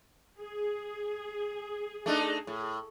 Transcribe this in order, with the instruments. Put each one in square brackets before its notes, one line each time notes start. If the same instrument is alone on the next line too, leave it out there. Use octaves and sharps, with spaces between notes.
[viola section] G#4
[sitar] A3 D4 D#4
A2